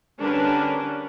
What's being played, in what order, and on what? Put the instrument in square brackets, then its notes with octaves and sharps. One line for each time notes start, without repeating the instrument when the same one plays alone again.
[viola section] D3 G3 C#4 D4 A#4 B4